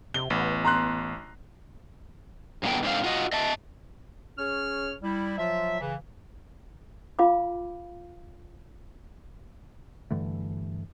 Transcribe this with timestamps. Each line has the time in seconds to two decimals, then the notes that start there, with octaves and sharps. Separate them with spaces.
0.14 C3 G7
0.30 A1 B3
0.65 A#5 C6 F#6
2.63 F#2 A#2 D3 G#3 B3 G5
2.83 G#2 D3 C4 F5
3.04 F4 F#4 D#5
3.33 D#5 E5 A5
4.38 C#4 G#4 C#5 F6
5.02 G3 E4
5.38 F3 F#3 F4 E5
5.80 C#3 E3
7.19 F4 F5 B5 D6
10.11 G2 D3 E3 A3